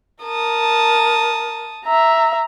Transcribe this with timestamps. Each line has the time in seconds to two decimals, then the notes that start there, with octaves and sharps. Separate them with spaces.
0.24 A#4 A5 D#6
1.86 E5 A#5